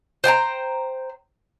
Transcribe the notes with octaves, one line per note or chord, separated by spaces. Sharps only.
C5 G5 G#5 A#5